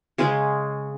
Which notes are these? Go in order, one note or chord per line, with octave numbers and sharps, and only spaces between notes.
C#3 G#3 C#4 G#4